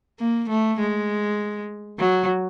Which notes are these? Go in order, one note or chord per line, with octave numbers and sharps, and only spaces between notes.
A#3
A3
G#3
F#3